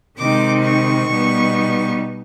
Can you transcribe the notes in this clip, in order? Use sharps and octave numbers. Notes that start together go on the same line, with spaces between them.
C3 D#3 G#3 C4 D#4 D6
C#6
B2 G3 B3 D#4